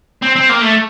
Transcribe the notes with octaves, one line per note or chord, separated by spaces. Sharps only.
C4
C4
A#3
A3